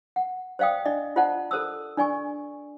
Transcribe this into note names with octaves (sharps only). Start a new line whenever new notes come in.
F#5
C5 D5 F5 G5 D#6
D4 D5 D#5
F4 C5 D5 F#5 A5
A4 A#4 C5 D#6 E6
D4 D5 G#5 C#6